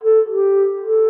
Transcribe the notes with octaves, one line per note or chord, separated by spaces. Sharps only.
A4
G4
A4